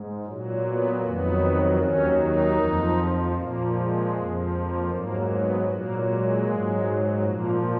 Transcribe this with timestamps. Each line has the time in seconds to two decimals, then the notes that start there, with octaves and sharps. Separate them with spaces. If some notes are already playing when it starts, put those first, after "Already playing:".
Already playing: G#2
0.25 A#2 F#3
0.64 B3
1.03 F2 D#3 F#3 B3
1.81 D#2 D#3 F#3 C#4
2.19 D#4
2.58 F2 F3
3.36 A#2 F3 A#3
3.74 G#3
4.13 F2 F3
4.52 A#3
4.90 G#2 F#3 A#3
5.29 B3
5.68 A#2 F#3 A#3
6.07 G#3
6.46 G#2 F#3
7.23 A#2 F3 A#3